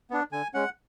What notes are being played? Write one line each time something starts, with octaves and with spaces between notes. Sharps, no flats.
B3 D4
D3 G#5
G#3 C#4 F#5